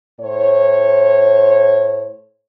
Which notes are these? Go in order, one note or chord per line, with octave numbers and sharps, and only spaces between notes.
A2 C5 C#5